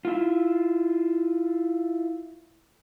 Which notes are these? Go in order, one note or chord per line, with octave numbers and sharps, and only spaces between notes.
E4 F4